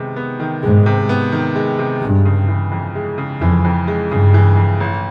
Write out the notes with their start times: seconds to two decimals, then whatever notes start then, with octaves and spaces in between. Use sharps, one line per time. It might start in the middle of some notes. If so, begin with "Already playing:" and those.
Already playing: C3 D#3 G#3 B3
0.16 B3
0.40 D#3
0.63 G#2 G#3
0.86 C3
1.09 B3
1.32 D#3
1.56 G#3
1.79 C3
2.01 G2 G#3
2.25 C#3
2.48 E3
2.72 F2
2.95 G#3
3.18 C#3
3.41 F2 E3
3.65 F2
3.88 G#3
4.11 G2 C#3
4.34 E3
4.57 F2
4.80 A1